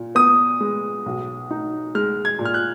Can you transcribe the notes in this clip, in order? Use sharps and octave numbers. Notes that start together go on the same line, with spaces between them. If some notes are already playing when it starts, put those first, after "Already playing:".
Already playing: A#2
B3 D#6
G#3
B1
D#4
G#3 F6
G#6
A#2
F6
F#6